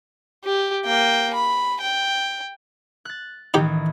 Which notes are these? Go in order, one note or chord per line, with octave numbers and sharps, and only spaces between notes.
G4
A#3 G5
B5
G5
F#6 A6
A1 D#3 E3 D#4 G4